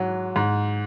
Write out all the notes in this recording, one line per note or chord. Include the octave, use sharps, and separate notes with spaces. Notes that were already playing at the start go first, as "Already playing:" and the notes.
Already playing: G#2 F#3
G#2